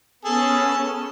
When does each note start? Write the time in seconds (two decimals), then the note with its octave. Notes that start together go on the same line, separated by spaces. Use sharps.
0.25 B3 C#4 G#4 A4